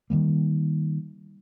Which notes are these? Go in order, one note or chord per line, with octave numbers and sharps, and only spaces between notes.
D#3 E3 G3 A#3